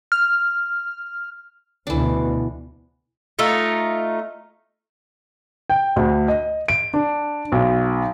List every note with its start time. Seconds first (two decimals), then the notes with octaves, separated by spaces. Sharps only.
0.12 F6
1.87 D2 B2 E3 D4
3.39 A3 D#4 F4
5.70 G5
5.96 D2
6.28 D#5
6.68 D7
6.94 D4
7.52 B1